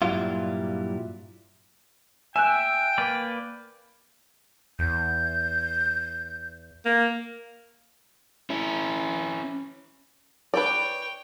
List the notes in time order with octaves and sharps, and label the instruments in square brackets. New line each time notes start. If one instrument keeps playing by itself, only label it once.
[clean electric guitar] G2 A#2 F#3 G3 E4 F4
[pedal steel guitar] E5 [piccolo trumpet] G5 [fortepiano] G#5 F#6
[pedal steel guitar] A#3 B4 D5
[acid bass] E2 [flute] G6
[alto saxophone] A#3
[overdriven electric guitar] C#4 E4
[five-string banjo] B4 D5 [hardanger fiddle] C#5 G5